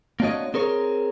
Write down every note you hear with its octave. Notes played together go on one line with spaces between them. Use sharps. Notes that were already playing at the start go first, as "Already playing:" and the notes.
A#3 C4 D4 F#4 C#5 D#5
C4 G#4 A#4 C#5